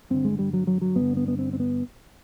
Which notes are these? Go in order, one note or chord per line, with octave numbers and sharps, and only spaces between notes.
G2 D3 C4
G#3
G3
F#3
F#3
F#3
G2 D3 B3
B3
B3
C4
C4
B3